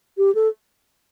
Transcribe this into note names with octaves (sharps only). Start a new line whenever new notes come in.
G4
A4